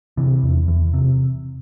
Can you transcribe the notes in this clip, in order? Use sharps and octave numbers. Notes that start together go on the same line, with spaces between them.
C3 E3
E2
E2
C3